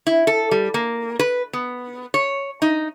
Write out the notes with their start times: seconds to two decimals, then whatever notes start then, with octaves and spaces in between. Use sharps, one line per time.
0.07 E4
0.27 A4
0.51 G3
0.74 A#3
1.19 B4
1.53 B3
2.14 C#5
2.62 D#4